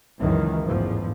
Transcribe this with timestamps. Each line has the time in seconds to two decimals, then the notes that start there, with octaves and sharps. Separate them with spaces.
0.19 C#2 F#2 D#3 E3
0.63 A1 E2 G#2 F3